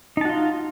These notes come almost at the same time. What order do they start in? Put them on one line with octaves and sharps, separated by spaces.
D#4 A5 F#4 F4